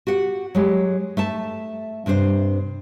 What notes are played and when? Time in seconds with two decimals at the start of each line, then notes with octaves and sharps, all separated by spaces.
0.07 F#4 G4 F#5
0.55 F#3 G#3 G4
1.17 A3 E5 A5
2.06 G2 C3 D4 C5